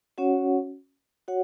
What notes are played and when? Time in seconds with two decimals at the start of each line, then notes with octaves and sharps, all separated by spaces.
0.18 C#4 F#4 C#5 F#5
1.28 F#4 C#5 F#5